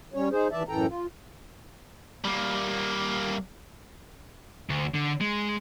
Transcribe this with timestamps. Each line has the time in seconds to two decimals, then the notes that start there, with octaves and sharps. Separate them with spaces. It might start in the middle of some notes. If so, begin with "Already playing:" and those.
0.14 G3 C#4 C#5
0.32 D#4 G#4 C5
0.51 D#2 E3 D5 E5 A5
0.69 F#2 A2 E3 A4 G5 A#5
0.88 F4
2.25 G3 A#3
4.70 D2
4.94 D3
5.21 G#3